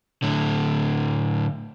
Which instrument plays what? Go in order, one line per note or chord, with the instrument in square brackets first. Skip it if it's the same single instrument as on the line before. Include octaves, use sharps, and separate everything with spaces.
[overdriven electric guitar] A2 D3